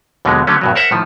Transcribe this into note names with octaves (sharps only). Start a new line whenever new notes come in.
D#2 B2 D3 F#3 G#3
D3 F#3 A3 C#4
G2 B2 F#3
A#4 C5 C#5 E5 F#5
A2 D#3 F3